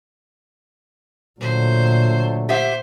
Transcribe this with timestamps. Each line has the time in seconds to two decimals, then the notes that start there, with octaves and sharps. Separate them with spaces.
1.40 A#2 D3 F#3 A3 C5
2.49 G4 C5 E5 F#5